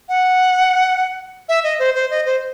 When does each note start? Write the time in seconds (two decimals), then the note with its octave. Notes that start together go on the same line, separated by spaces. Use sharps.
0.09 F#5
1.49 E5
1.64 D#5
1.79 C5
1.95 C5
2.10 D#5
2.25 C5